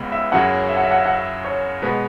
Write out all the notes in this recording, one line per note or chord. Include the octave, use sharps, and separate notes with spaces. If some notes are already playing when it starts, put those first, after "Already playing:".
Already playing: C#2 C#3 G#3 B3
E5
F#2 C#3 F#3 C#4 E4 F#5
E5
F#5
E5
F#5
E5
F#5
E5
C#5
B2 G#3 B3 B4